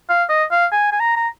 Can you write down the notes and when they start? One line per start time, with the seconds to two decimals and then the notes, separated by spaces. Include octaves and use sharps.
0.09 F5
0.29 D#5
0.52 F5
0.72 G#5
0.92 G#5
1.00 A#5
1.16 A#5